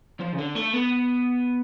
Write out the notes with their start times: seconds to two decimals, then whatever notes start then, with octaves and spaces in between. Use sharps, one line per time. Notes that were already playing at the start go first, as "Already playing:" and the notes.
0.20 F3
0.33 C#3
0.38 D3
0.55 A3
0.73 B3